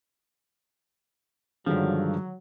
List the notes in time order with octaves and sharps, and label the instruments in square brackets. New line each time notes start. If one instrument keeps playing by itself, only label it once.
[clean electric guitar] G2 F3 [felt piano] D3 D#3 G#3 [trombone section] F#3